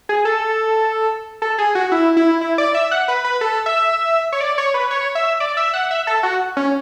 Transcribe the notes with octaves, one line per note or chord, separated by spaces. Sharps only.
G#4
A4
A4
G#4
F#4
E4
E4
E4
D5
E5
F#5
B4
B4
A4
E5
C#5
D5
C#5
B4
C#5
E5
D5
E5
F#5
E5
A4
F#4
C#4